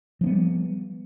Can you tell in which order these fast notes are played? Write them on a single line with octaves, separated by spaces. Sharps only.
F3 C4 B3 G3